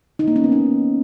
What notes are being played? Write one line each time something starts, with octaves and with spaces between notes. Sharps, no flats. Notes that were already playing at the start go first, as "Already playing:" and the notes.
D#4
A#3
C#4
B3
C#4